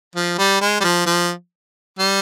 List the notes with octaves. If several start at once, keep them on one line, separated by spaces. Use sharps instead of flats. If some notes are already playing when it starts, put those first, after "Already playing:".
F3
G3
G#3
G3
F3
F3
G3